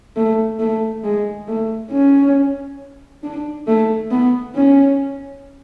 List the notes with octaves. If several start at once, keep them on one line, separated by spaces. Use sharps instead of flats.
A3
A3
G#3
A3
C#4
D4
A3
B3
C#4